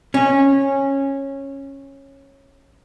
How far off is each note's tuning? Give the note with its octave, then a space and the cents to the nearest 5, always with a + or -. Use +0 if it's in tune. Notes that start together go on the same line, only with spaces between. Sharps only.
C#4 -15